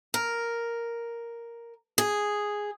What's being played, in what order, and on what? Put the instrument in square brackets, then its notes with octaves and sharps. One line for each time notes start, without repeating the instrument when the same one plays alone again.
[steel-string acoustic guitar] A#4
G#4